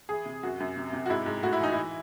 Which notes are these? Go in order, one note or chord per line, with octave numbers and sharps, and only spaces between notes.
E3 G#4
C3
F#2 F#4
F#2
C3
C3
F#4
G#2 E4
G#2
A2 F#4
E4
E3 D#4
E3 E4